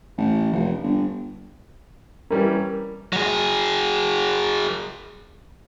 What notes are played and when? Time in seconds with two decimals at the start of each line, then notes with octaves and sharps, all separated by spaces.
0.17 A1
0.53 F1
0.83 G1
2.30 E3 G3 C#4 A#4
3.13 F#3 G#4